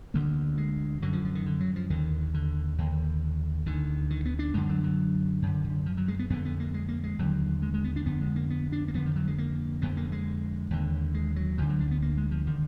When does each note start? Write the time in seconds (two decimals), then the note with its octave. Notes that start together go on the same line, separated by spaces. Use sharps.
0.14 D2 D3 A#3
0.58 G#3
1.02 F#2 D3 F#3
1.13 F3
1.25 F3
1.35 D#3
1.46 D3
1.60 F#3
1.76 F3
1.90 D#2 D3 D#3
2.34 D3
2.78 D#2 D3
3.66 D2 D3 D#3
4.10 D#3
4.26 B3
4.39 D4
4.54 F#2 D3 G#3
4.69 F#3
4.84 F#3
5.42 F#2 D3
5.65 D3
5.86 F3
5.97 F#3
6.08 G#3
6.19 B3
6.30 F2 D3 B3
6.45 B3
6.60 A#3
6.74 G#3
6.89 A#3
7.04 G#3
7.19 D#2 D3 F#3
7.62 G#3
7.74 G#3
7.84 B3
7.96 D4
8.06 F2 D3 B3
8.21 G#3
8.36 A#3
8.50 B3
8.72 D4
8.88 A#3
8.94 F2 D3 B3
9.06 D#3
9.16 F#3
9.27 G#3
9.38 A#3
9.82 F2 D3 B3
9.97 A#3
10.12 G#3
10.70 D#2 D3
11.14 G#3
11.36 F#3
11.58 D2 D3 F3
11.69 F#3
11.80 D4
11.91 B3
12.02 A#3
12.17 G#3
12.31 F3
12.47 D3 D#3